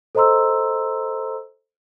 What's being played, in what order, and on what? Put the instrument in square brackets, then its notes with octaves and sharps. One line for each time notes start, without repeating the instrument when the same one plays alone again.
[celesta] A4 C5 D#5 A#5 C6 E6